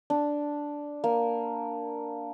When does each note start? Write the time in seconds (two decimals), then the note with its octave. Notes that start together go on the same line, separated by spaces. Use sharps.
0.10 D4
1.04 A#3